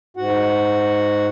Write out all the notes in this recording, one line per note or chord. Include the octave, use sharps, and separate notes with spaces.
G#2 F#4 F#5